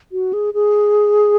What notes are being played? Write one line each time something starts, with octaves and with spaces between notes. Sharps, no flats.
F#4
G#4
G#4